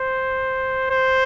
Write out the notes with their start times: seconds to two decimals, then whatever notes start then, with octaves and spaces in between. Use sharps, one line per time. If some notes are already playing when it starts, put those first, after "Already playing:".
Already playing: C5
0.90 C5